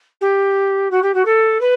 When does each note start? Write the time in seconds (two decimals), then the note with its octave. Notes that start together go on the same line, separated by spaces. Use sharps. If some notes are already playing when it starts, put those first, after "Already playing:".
0.21 G4
0.91 F#4
1.02 G4
1.14 F#4
1.25 A4
1.60 B4